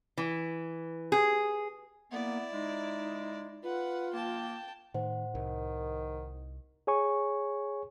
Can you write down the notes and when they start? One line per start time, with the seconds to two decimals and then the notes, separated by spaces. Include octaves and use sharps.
0.17 E3
1.12 G#4
2.12 A#3 B3 E4 D5
2.53 G#3 D#4
3.63 F4 B4 F#5
4.14 A#3 G5 A5
4.94 A2 D#3 C5 F#5
5.35 C2 D#3
6.87 G#4 C#5 G#5 C#6